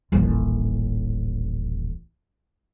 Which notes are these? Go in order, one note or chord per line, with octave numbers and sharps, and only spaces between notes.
D#1 A1